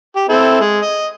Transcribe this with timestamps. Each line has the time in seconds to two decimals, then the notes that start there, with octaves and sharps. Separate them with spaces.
0.16 G4
0.29 C4 E4 A4
0.60 G#3
0.82 D#5